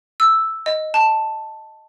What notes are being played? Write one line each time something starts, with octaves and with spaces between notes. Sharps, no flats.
E6
D#5
A5